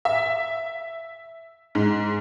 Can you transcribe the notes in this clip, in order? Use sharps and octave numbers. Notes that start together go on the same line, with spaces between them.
E5
G#2